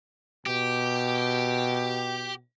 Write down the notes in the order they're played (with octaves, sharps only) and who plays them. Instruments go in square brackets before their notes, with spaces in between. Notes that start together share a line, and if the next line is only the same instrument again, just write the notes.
[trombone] B2 [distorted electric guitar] G4